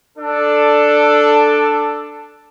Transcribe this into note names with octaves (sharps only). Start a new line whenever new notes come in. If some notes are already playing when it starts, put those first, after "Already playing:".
D4 A4